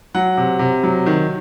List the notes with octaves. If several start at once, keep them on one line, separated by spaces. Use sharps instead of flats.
F#3 F#5
C3
C3
F#3
D#3